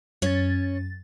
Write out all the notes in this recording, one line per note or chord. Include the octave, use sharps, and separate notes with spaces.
F#2 C#4 C#5 A6